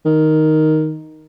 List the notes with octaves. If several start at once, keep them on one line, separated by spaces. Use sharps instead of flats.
D#3